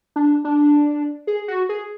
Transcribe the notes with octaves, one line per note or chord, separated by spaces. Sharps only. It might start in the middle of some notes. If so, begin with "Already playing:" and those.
D4
D4
G#4
F#4
G#4